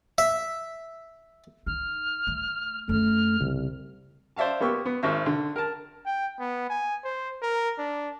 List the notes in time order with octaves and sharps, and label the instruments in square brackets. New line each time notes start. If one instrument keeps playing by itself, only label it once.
[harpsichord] E5
[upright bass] D#4 [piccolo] F6
[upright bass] A3
[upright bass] F#2 A#3 [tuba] A3 [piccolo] F6
[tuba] C2 [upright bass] C#3
[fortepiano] C5 D5 E5 F5 A5
A#3 B3 G4 C#6 E6
B3
G#1 A#4 C5 E5 C#6
D3
A#4 A5
[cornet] G5
B3
G#5
C5
A#4
D4